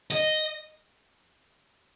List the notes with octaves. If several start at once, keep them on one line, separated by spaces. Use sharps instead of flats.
D#5